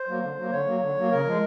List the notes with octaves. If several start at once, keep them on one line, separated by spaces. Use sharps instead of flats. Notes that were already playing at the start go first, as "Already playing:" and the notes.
Already playing: C5
F#3 A#3
D3
F#3 A#3
D3 C#5
F#3 A#3
D3
F#3 A#3
C#3 A#4
F3 G#3